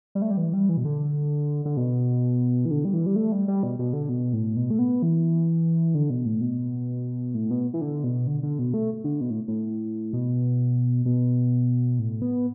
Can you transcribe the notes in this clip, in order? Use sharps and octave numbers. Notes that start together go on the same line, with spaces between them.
G3
A3
G3
E3
G3
E3
B2
D3
D3
B2
E3
D3
G3
E3
G3
A3
G3
G3
B2
B2
D3
B2
A2
B2
A3
B3
E3
D3
B2
A2
B2
A2
B2
E3
D3
B2
D3
D3
B2
A3
D3
B2
A2
A2
B2
B2
A2
B3